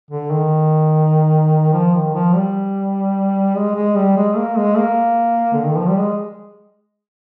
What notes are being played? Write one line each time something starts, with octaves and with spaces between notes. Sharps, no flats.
D3
D#3
F3
D#3
F3
G3
G#3
G#3
G3
G#3
A#3
G#3
A#3
D3
D#3
F3
G3
G#3